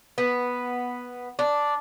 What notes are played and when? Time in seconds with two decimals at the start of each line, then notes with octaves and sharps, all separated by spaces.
0.18 B3
1.39 D4